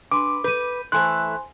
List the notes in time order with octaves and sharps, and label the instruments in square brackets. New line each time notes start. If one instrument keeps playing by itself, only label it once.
[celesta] D4 C6 [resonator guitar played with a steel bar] B4 [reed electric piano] D6
[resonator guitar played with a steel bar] B4 [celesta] G6 D#7
[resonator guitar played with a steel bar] E3 A3 [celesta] C5 G#5 C6 [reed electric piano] F#6